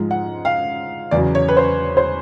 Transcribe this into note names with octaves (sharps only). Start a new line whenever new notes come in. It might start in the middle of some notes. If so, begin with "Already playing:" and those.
Already playing: G#2 F3 G#3
F#5
F5
E2 C#3 F#3 D5
C#5
B4
C5
C5